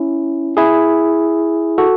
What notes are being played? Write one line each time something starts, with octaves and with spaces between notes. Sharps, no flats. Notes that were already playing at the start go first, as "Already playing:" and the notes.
Already playing: C#4 E4
E4 G#4
F#4 A4